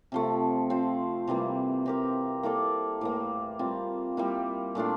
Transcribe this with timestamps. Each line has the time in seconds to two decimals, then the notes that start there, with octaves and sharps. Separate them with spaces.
0.12 C3 F3 A3
0.70 C4 F4 C5
1.27 C3 E3 G3 A#3
1.86 C4 G4 A#4
2.43 A#3 E4 A4 D5
3.01 A2 E3 A#3
3.59 G3 C4 F4
4.17 G3 A#3 E4
4.75 A#2 A3 D4 F4